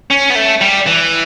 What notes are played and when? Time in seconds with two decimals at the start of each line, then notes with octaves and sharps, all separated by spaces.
0.11 C#4
0.30 B3
0.36 A3
0.61 G3
0.86 E3